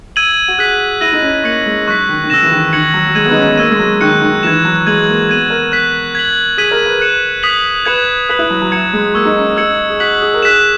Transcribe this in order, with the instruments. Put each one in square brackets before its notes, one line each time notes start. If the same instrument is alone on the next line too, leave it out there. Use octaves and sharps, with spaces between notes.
[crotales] E6 G#6 D#7 F#7
[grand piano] F#4
[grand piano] G#4 [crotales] F#6 B6 F#7
[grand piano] E4 [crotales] E6 A#6 D#7 F#7
[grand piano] D#4
C#4
[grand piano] A#3 [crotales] C#6 G#6 C#7 F#7
[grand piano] G#3
[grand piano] F#3 [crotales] C#6 F#6 B6
[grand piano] D#3
D#3
[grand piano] C#3 [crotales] E6 A#6 E7
[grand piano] E3
D#3
[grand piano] D#3 [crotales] G#6 C#7 F#7
[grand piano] F#3
F#3
[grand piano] G#3 [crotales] G#6 D#7 F#7
[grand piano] B3
D#4
C#4
B3
[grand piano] A#3 [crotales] E6 G#6 D#7
[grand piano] G#3
F#3
[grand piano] D#3 [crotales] C#6 F#6 C#7
[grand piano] D#3
[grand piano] E3 [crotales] G#6 C#7 E7
[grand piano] F#3
[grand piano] G#3 [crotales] G#6 D#7 F#7
[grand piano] A#3
[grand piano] B3 [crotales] G#6 D#7 F#7
[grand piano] A#4
[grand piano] A#4 [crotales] F#6 B6 F#7
[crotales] G#6 B6 F#7
[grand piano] G#4 [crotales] G#6 B6 D#7 F#7
[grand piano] A#4
B4
[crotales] F#6 C#7 E7
D#6 F#6 B6 F#7
[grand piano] B4 [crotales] G#6 C#7 E7
[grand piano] B4 [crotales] F#6 B6 F#7
[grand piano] E4
F#3
F#3
[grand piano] F#3 [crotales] G#6 C#7 E7
[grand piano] G#3
[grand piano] A#3 [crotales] C#6 E6 G#6
[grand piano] D#4
C#4
[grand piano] D#4 [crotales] E6 G#6 C#7 F#7
[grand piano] G#4
[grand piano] F#4 [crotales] F#6 B6 F#7
[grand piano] G#4
A#4
[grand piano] G#4 [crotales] F#6 B6 E7